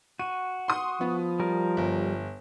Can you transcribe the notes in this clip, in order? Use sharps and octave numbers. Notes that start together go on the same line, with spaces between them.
F#4 D#7
C6 D#6
F3 B3
G3 A#4
G1